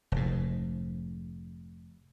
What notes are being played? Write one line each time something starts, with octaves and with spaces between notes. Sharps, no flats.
F1 G#2